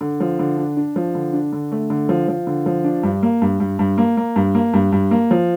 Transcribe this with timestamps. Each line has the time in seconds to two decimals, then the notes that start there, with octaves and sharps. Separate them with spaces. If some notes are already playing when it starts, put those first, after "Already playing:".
0.01 D3
0.20 F3
0.39 D3
0.57 D4
0.77 D4
0.96 F3
1.15 D3
1.33 D4
1.52 D3
1.72 A3
1.90 D3
2.09 F3
2.28 F3
2.47 D3
2.66 F3
2.84 D4
3.03 G2
3.23 A#3
3.42 G2
3.60 G2
3.79 G2
3.98 A#3
4.17 A#3
4.36 G2
4.55 A#3
4.73 G2
4.92 G2
5.11 A#3
5.31 F3